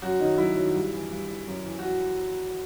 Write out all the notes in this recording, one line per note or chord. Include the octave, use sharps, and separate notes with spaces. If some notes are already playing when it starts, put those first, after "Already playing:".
F#2 F#4
D#3 F#3 D#4
F#2 E4
D#3 F#3
G2
E3
G2
E3
F#2
E3
F#4